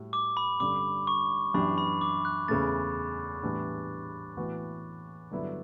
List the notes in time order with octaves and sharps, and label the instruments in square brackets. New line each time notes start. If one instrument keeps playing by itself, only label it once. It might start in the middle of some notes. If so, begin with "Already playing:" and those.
Already playing: [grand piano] A2 G3 F#4
[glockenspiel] D6
B5
[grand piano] G2 D3 G3 C#4 [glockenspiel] D6
[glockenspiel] C#6
[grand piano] F#2 E3 B3 D4 G4 [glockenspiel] B5
[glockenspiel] B5
D6
F#6
[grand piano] E2 C#3 E3 A3 [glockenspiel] A6
[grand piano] A2 E3 G3 B3 D4
A2 E3 B3 F#4
G2 D3 F#3 B3 E4